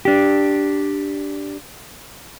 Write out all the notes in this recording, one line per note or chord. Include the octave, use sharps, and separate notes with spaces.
D4 G4